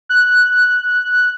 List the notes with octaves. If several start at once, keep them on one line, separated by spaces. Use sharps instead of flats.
F#6